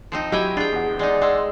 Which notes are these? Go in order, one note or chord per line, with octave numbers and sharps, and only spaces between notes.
F3 C4 D#4
F#3 E4 G4 D#5 G5 G#5
D4 F4 G#4 G5
E2 F#5
G#3 D#4 D5
G#3 F#5 C6 E6